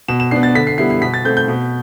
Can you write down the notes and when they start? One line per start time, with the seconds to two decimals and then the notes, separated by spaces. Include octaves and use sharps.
0.08 B2 E7
0.20 E7
0.31 B3 D4 C7
0.43 A6
0.55 D3 B6
0.67 C7
0.78 G3 B3 E4 C7
0.90 C7
1.02 B2 B6
1.14 A6
1.25 A3 C4 G6
1.37 G6
1.48 B2